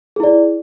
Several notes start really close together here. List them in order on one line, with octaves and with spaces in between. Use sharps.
G#4 E4 D5